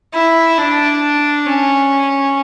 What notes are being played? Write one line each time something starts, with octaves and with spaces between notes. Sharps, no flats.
E4
D4
C#4